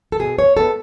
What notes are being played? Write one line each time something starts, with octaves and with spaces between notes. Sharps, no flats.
A4
B2 G#4
C#5
G#3 B3 A4